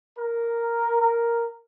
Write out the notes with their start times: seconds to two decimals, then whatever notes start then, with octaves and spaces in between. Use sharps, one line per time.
0.17 A#4
1.00 A#4